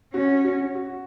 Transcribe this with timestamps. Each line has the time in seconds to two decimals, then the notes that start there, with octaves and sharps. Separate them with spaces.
0.14 C#4 F#4
0.45 F#4
0.75 F#4